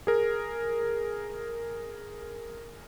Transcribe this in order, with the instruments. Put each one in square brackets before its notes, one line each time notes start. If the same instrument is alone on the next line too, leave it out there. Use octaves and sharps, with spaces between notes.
[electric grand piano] G#4 A#4